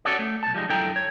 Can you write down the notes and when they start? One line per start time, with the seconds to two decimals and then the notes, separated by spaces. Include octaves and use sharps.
0.05 C#4 F#4 A4 C#5 D5
0.19 A3
0.43 B1 A5
0.54 F3 G3 G#3 D#4
0.69 F#2 D3 E4 A4 G5 A#5
0.96 C#5